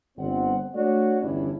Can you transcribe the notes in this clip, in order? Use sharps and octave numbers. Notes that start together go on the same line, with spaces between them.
G1 C4 F#5
A3 D4 F#4 C#5 D5
G1 E2 G2 C#4 D4 E4